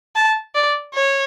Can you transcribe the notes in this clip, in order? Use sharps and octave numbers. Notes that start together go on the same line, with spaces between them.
A5
D5
C#5